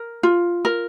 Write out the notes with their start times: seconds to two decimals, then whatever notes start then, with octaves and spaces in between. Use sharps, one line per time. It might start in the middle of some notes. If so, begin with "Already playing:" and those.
Already playing: A#4
0.23 F4
0.65 A#4